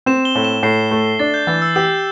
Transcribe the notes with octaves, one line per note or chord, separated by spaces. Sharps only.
C4 E7
G7
A2
E7
A2 C7
A3
D4 A6
G6
E3 A6
E6
G4 G6